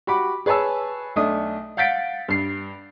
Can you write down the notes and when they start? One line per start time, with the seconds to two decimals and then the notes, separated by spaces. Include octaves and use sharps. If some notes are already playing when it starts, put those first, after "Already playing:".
0.07 F#4 G4 B5 D6
0.46 G#4 B4 C#5 G#5 A5 E6
1.16 B1 A3 D4 D#6
1.77 F5 F#5 G6 A6 B6 D7
2.28 G2 C7